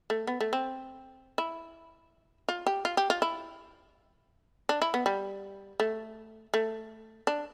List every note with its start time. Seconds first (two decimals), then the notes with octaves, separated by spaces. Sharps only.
0.10 A3
0.27 B3
0.40 A3
0.53 C4
1.38 E4
2.49 F4
2.67 G4
2.85 F4
2.97 G4
3.10 F4
3.22 E4
4.69 D4
4.82 E4
4.94 B3
5.06 G3
5.80 A3
6.54 A3
7.27 D4